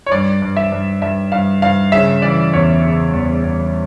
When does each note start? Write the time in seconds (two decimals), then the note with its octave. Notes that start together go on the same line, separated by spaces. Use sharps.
0.06 C#5
0.11 G2 D5
0.42 G2
0.57 E5
0.72 G2
1.02 G2 E5
1.32 G2 F5
1.62 G2 F5
1.92 C#3 E5
2.22 E3 D5
2.53 E2 C#5
2.82 C#3
3.13 E2
3.44 E2